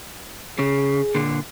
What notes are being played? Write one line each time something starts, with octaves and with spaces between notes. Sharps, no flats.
C#3 G#4
A#2 D3